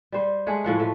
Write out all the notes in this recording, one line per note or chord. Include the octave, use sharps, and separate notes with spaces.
G3 C5
G#3 A3 G#4 F#5
A2 F3 F#5
F3 A3